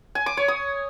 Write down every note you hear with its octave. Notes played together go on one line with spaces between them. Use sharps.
G#5
D6
C#5
D#6